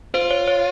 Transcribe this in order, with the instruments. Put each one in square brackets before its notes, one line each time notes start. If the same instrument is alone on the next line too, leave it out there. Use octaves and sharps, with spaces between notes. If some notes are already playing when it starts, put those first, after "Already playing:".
[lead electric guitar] F4 [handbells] C5
[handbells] C#5
C#5